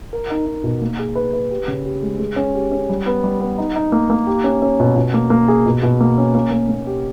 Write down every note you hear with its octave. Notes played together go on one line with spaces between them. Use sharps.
A#4
D#4
D#4
B2
A#3
G#4
B4
B4
G4
C#3
G4
G#3
G#3
C#4
G4
C#4
G3
B3
G3
B3
D#4
D#4
A#3
A#3
G4
C#4
C#4
B2
B2
A#3
A#3
G#4
B2
B2
A#3
C#4
A#3
A#3
A#3
G4